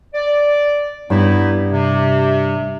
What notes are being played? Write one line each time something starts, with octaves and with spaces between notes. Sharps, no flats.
D5
G2 B3 D#4 E4
C3